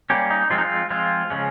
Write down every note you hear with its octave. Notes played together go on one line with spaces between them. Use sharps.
G3 A#3 C#4 G4
D#4
F3 G#3 C4 F4
D#4
F4
F3 G#3 C4 F4
C#3 F3 G#3 C#4